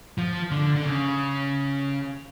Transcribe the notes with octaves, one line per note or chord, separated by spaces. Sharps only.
F3
D3
D3
C#3